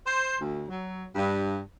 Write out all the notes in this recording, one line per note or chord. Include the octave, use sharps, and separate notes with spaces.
C5
D2
F#3
G2